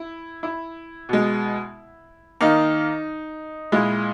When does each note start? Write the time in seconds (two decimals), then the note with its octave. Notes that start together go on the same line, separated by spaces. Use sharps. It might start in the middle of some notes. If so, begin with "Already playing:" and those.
Already playing: E4
0.43 E4
1.09 B2 G#3
2.41 D#3 A#3 D#4
3.72 A#2 G#3 E4